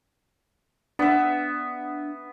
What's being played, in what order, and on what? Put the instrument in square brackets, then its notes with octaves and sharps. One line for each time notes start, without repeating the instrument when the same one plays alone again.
[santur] B3 E5 [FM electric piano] D4